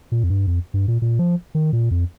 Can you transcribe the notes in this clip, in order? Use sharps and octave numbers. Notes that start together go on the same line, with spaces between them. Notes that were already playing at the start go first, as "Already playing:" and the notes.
A#2
F2
G2
F2
G2
A#2
A#2
F3
D#3
A#2
F2